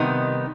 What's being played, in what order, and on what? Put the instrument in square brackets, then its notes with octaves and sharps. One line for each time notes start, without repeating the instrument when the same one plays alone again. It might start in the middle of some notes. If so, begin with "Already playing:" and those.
Already playing: [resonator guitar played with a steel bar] C3 D#3 G3 B3 D#4